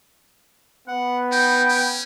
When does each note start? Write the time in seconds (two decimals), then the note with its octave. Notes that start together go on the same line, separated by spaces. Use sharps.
0.88 B3 F#5
1.32 D#4 G5
1.69 C#4